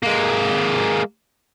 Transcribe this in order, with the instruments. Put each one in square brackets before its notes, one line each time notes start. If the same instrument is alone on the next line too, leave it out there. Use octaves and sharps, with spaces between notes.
[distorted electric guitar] G#3 A#3